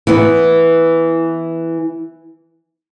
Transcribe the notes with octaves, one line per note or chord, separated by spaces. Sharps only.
E3 B3